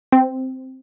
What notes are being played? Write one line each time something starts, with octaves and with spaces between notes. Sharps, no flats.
C4